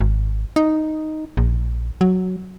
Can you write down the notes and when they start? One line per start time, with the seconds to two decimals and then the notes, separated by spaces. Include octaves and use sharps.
0.01 G#1
0.56 D#4
1.37 A#1
2.01 F#3